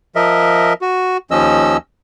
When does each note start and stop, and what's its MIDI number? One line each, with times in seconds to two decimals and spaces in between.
0.16 0.73 53
0.16 0.73 70
0.16 0.73 75
0.16 0.73 76
0.81 1.17 66
1.31 1.77 39
1.31 1.77 53
1.31 1.77 61
1.31 1.77 75
1.31 1.77 88